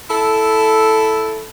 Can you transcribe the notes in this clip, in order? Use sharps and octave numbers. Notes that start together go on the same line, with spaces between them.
E4 A4